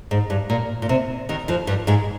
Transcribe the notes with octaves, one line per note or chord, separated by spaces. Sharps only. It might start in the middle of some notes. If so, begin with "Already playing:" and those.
G#2
G2
A#2
A#2
C3
D#2 D#3
F2 F3
G2 G3
G#2 G#3